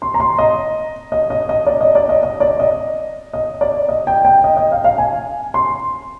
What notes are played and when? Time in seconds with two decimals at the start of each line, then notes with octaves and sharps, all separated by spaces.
0.02 C6
0.14 A#5
0.20 C6
0.38 D#5
1.12 D#5
1.30 D#5
1.49 D#5
1.67 D5
1.81 D#5
1.95 D5
2.09 D#5
2.23 D#5
2.40 D5
2.60 D#5
3.33 D#5
3.61 D5
3.89 D#5
4.07 G5
4.25 G5
4.44 D#5
4.57 D#5
4.72 F5
4.84 F5
4.98 G#5
5.54 C6